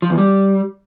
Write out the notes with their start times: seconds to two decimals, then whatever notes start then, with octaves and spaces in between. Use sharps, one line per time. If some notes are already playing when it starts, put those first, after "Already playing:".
0.02 F3
0.10 E2
0.18 G3